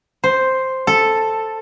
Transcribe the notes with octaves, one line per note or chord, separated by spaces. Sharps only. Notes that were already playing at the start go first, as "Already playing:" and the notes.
C5
A4